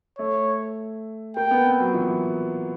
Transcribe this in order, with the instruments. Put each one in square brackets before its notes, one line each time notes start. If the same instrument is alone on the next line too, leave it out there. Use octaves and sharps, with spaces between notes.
[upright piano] A3 [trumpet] C#5
[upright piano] A#3 [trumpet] G5
[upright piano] B3
C4
F#3
F3
E3